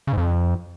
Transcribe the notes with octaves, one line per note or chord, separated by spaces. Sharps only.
C#3
G#2
F2